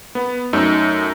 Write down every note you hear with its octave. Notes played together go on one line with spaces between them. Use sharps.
B3
F#2 A3 D#4 E6